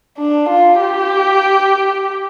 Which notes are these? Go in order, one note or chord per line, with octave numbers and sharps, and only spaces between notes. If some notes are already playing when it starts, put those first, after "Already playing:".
D4
F4
G4